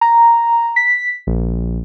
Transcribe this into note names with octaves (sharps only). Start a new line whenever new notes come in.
A#5
B6
A#1